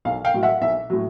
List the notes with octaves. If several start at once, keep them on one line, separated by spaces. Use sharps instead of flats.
B1 F5
F5 G5
A2 F#3
E5 F#5
B1 E5
A2 F#3